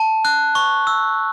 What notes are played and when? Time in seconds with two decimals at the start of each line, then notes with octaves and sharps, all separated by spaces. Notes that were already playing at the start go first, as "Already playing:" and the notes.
Already playing: A5
0.25 F#6
0.55 C#6
0.87 E6